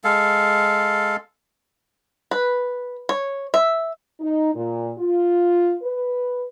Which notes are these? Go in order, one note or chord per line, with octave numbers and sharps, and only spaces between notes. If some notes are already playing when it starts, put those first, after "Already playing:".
G#3 A4 F5
B4
C#5
E5
D#4
A#2
F4
B4